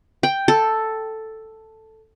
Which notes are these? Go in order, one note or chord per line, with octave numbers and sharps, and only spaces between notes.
G5
A4